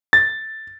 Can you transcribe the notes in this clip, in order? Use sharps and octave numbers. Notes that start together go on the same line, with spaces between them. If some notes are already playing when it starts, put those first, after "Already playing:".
A6